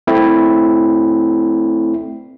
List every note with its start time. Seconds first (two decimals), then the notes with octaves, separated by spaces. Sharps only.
0.07 A3 C4 E4